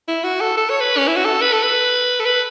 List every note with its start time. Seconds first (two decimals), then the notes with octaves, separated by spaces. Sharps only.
0.08 E4
0.24 F#4
0.41 A4
0.57 A4
0.70 C#5
0.81 B4
0.98 C#4
1.08 E4
1.16 F#4
1.25 A4
1.42 B4
1.53 A4
1.63 B4
2.20 A4
2.26 B4